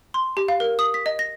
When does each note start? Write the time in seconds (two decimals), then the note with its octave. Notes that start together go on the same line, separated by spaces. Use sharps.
0.14 C6
0.37 G4
0.48 F5
0.60 A#4
0.79 D#6
0.94 B6
1.06 D#5
1.19 A#6